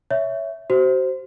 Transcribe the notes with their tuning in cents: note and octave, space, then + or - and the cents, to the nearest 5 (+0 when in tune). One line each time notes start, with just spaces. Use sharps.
C#5 +10 E5 +0
F#4 +35 C5 +0